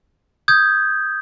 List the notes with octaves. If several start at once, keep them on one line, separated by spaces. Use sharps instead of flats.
D#6 G6 G#6